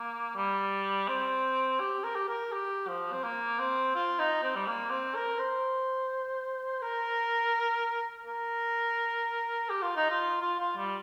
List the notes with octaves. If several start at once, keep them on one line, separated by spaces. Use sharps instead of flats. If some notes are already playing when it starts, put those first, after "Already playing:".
Already playing: A#3
G3
C4
G4
A#4
G4
A#4
G4
F3
C4
A#3
C4
F4
D#4
C4
G3
A#3
C4
A#4
C5
A#4
A#4
G4
F4
D#4
F4
F4
F4
G3